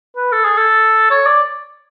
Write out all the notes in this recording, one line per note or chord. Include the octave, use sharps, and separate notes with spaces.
B4
A4
G#4
A4
C#5
D5